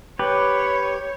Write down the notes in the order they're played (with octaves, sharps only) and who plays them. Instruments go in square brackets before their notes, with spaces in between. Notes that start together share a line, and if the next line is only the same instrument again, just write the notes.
[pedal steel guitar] G4 B4 [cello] C#5